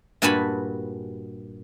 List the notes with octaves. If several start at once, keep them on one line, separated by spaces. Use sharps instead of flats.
G2 A#2 F#4 G#5 A5 B5